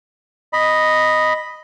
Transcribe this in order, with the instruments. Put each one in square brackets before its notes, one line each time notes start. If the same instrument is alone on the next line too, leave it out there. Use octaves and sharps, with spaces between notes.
[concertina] D#5 B5